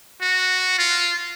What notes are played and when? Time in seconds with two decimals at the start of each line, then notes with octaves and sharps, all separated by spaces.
0.21 F#4
0.78 F4